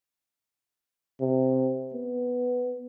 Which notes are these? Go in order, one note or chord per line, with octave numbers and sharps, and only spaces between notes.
C3
B3